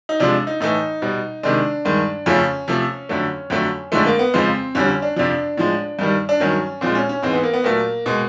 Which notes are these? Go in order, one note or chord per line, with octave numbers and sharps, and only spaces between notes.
D#4
C3 F3 G#3 D4
D#4
A2 E3 A3 D#4
B2 G3
C3 D#3 G#3 D4
G2 D#3 G#3
F2 C#3 F3 A3 C#4
C3 F3 A3
F2 D3 F#3 A3
F2 D3 F#3 A3
F2 D3 F3 G#3 A3
A#3
B3
F2 C#3 F3 G#3 C4
F2 D3 G3 C#4
C#4
D4
F2 C3 F3 D4
A2 F3 G#3
G2 D#3 G3
D4
G2 D#3 F#3 C#4
A#2 F3 G#3 C4
C#4
C#4
G#2 E3 G#3 C4
B3
A#3
B3
A#2 F#3 A3 A#3
B2 G#3